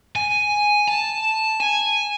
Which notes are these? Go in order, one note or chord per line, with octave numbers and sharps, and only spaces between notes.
G#5
A5
G#5